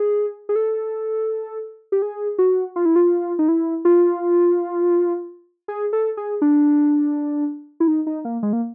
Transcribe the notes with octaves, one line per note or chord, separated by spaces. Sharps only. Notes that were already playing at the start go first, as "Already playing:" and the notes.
Already playing: G#4
G#4
A4
G4
G#4
F#4
F4
E4
F4
D#4
E4
F4
G#4
A4
G#4
D4
E4
D#4
D#4
A#3
G#3
A#3